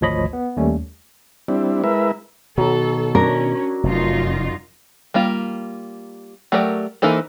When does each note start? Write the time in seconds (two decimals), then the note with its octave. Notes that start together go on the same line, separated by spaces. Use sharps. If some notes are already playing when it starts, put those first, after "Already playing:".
0.01 G#1 D2 F3 C#5 D#5 B5
0.33 B3
0.57 D#2 G3 A3 C#4
1.48 G3 C4 D4 E4
1.84 G#3 E4 A#4 B4 E5
2.58 B2 D#3 F#3 A4
3.15 C#4 D4 A#4
3.83 F1 F#2 D#4 F4
5.14 G3 A#3 F4
6.52 F#3 A3 G4 A#4 D5
7.02 E3 A#3 D#4 A4 C5